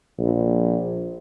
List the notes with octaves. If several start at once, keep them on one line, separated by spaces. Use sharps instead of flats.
A#1